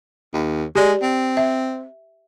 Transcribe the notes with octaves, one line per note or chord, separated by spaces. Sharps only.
D#2
G#3 G4 D5
C4
E5